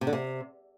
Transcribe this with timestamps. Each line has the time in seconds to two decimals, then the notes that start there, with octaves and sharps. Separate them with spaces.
0.01 C3
0.07 D3
0.13 C3